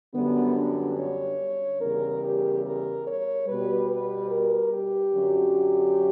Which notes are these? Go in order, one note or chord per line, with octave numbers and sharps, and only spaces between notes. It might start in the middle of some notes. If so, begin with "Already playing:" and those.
F#2 D3 G3 B3
D4
C#5
E2 C#3 G3 A#4
G4
A#4
C#5
B2 G3 B4
B4
A#4
G4
F#2 D3 F#3